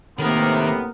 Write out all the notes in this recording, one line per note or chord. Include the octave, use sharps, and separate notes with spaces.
A2 C3 D#3 A#3 B3 A#4